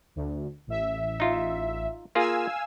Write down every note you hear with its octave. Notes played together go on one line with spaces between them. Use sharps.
D2
A1 E5
D#4 F4
A#3 F4 G#4 F5 G#5 E6